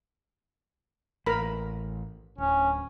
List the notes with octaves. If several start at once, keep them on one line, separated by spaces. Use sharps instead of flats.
A1 A#4 B5
D1 C#4